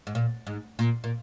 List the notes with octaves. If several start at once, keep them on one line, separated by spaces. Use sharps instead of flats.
G#2
A#2
G#2
A#2
A#2